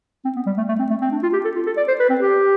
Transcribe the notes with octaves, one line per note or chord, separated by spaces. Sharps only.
C4
B3
G3
A3
A3
C4
A3
C4
D4
F4
G4
A4
F4
A4
D5
C5
B4
C4
G4